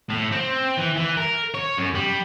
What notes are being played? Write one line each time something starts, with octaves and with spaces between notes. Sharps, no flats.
A2
C4
E3
E3
A#4
C#5
F#2
G3